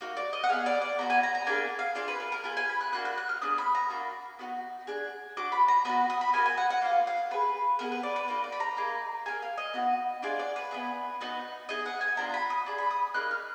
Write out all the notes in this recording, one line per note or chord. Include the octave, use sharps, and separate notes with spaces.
A#3 D#4 F#4
D5
D#5
F#5
B3 F4 G#4 F5
D5
D5
B3 D#4 F#4 A#5
G#5
A#5
A#5
A#3 D4 G#4 G#5
F5
D4 F4 G#4 D5
B4
A#4
A#4
B3 F4 G#4 A#4
G#5
B5
F#6
A#3 D4 F#4 F#6
F#6
F#6
F6
B3 D4 G#4 D#6
B5
A#5
A#3 D4 F#4
B3 D#4 F#4
D4 G#4
D4 F#4 D6
B5
A#5
B3 D#4 F#4 B5
D#6
B5
A#3 D#4 F#4 G#5
G#5
F#5
F#5
A#3 D4 F4 F5
F5
D4 G#4 B4
B3 D#4 G#4 A#4
B4
D5
B4
A#3 D#4 F#4 D5
D5
B5
A#5
A#3 D#4 G#4
A#3 F4 G#4 G#5
F5
D#5
B3 D#4 F#4
D4 F4 G#4 D5
D5
B4
B3 D#4 G#4
B3 D#4 F#4
B3 D#4 G#4 D#5
F#5
G#5
B3 D4 F4 A#5
B5
D#6
D4 G#4
B5
D#6
A#3 D#4 G#4 F#6
F6